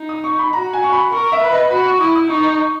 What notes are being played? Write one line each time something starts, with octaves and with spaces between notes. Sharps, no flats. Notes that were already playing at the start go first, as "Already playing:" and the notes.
Already playing: D#4
D#6
C#6
B5
F#4 A#5
G#5
C#6
B5
A#4 C#6
E5
B4
D#5
F#4 B5
C#6
E4 D#6
D#6
D#4 C#6
C#6